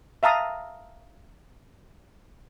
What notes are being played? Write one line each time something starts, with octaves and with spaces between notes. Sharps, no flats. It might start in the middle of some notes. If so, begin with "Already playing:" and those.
E5 F5 A5 A#5 D#6